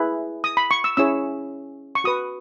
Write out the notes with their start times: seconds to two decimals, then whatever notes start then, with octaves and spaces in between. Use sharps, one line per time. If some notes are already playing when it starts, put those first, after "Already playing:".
Already playing: E4 G#4 B4
0.44 D#6
0.57 B5
0.71 C#6
0.84 E6
0.97 C#4 E4 G#4 C#5 E6
1.95 C#6
2.04 F#4 B4 D#6